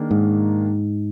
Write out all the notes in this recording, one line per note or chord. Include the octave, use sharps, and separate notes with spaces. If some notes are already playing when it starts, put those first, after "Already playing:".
Already playing: D#3 A#3 D4 G#4
G#2